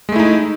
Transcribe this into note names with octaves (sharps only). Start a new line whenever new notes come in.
G#3 A3 D#4 E4